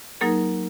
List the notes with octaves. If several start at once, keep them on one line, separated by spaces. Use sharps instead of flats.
F#3 A#3 D#4 G#4 A#4